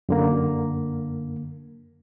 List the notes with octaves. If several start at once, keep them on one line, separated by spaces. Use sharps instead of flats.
F#2 D3 A#3